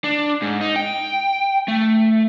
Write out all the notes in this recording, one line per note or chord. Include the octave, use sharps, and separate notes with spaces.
D4
G#2
D#4
G5
A3